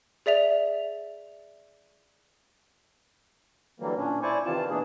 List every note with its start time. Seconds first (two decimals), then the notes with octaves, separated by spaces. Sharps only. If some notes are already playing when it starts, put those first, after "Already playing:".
0.26 G#4 D5 E5 F7
3.80 D3 E3 F#3 G3 A#3
3.97 A#2 C#4 D4
4.23 E4 C5 D5 G#5 C#6
4.45 C3 D#3 E3 C4 F4 A5
4.70 B2 E3 A#3 D4 G#4